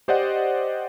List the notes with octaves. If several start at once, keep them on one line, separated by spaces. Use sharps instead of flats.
G4 C5 D5 D#5 F#5